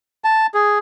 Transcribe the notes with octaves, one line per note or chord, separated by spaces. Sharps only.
A5
G#4